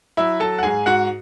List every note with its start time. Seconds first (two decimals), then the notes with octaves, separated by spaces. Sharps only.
0.17 F#3 E4 E5
0.40 F#3 A4 A5
0.59 F#5
0.63 G#2 G#4 G#5
0.86 G#2 F#4 F#5